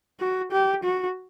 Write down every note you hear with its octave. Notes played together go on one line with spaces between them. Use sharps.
F#4
G4
F#4